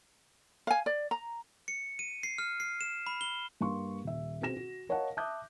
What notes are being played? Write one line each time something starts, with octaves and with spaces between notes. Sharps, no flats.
F5 G#5
D5
A#5
C#7
D#7
C7
F6
C7
E7
B5
G7
G2 A#3 F5 C6 C#6
D#1 E5
B2 C4 G#4 A#6 E7
F#4
A#4 C#5 D#5 F5 F#5 A5
E5 A5 D6 D#6 F#6 G6